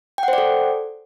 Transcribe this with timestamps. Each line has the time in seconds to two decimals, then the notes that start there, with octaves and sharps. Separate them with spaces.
0.18 G5
0.23 F#5
0.28 C5
0.33 D5
0.38 A4